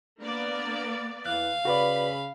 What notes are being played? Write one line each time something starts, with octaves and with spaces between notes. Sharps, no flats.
A#3 B3 D4 D5
E2 E3 F5 F#6
C#3 F#4 B4 D5 B5